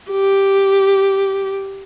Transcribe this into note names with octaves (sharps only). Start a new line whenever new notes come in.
G4